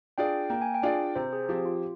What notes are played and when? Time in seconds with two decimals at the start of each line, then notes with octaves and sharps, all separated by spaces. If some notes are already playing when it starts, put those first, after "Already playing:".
0.18 D4 F4 G#4 D5 G5
0.50 A#3 G5
0.62 G#5
0.74 G5
0.83 D4 F4 G#4 D5
1.15 C3 C5
1.33 G#4
1.49 F3 C4 G4
1.65 F4